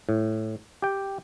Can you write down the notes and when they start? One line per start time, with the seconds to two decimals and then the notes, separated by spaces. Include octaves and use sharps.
0.09 A2
0.82 G4 G5